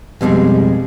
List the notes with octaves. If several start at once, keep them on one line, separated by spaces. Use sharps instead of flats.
F2 B2 F3 G3 G#3